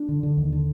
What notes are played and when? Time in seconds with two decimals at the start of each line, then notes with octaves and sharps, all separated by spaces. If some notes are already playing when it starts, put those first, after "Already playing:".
Already playing: D4
0.09 D3
0.23 D3
0.37 D#2
0.52 D3